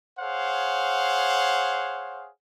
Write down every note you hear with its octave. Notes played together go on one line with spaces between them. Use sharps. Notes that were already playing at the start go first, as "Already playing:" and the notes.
G#4 C5 C#5 F5 F#5